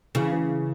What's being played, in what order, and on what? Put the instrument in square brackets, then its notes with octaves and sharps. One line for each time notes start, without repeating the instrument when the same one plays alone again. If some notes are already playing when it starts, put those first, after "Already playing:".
[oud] C#3 [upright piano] E3
[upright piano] E3